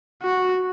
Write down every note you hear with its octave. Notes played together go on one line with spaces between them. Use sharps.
F#4